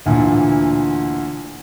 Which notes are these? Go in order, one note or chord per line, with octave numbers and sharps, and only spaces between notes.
D2 A#2 E3